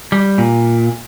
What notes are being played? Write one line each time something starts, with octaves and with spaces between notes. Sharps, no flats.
G3
A#2